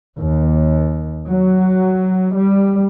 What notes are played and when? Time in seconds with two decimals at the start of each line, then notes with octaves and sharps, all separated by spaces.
0.18 D#2
1.28 F#3
2.35 G3